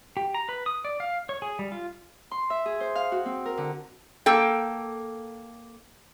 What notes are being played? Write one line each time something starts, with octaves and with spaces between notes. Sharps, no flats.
G4
A#5
B4
D#6
D5
F5
C#5
G#4
G3
F4
C6
E5
G#4
C5
F5
F#4
C4
A#4
D3
A#3 A4 G5